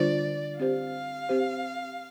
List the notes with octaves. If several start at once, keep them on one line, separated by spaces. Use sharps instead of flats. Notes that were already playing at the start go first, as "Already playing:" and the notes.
Already playing: D3 G3 D4 F4 C5 D5
C4 G4 C5 F5
C4 G4 C5